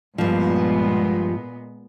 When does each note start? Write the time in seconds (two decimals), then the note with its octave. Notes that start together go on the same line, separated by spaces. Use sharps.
0.18 G2 A#2 F3 G#3 B3